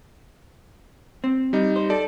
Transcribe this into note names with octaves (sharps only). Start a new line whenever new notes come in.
C4
G3 D#4
C5
A4 D5